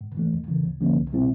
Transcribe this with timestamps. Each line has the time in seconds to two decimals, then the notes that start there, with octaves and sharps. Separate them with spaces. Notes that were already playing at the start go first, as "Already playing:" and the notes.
0.01 G#2
0.17 E3 A3
0.33 E2
0.48 C#3 E3
0.65 D2
0.81 D3 F3 A#3 C#4
0.96 C2
1.13 B2 G3 C4 E4